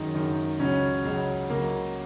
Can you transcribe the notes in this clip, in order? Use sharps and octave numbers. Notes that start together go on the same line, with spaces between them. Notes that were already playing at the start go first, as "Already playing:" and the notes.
Already playing: F#2 D#3 G#3 D#4
F#2 D#3 G#3
C#2 C#3 F#3 C#4
C#2 C#3 F#3
C#2 C#3 F#3 A#3